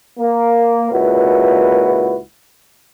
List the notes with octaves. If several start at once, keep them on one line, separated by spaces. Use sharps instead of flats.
A#3
C#2 A#2 E4 F#4 B4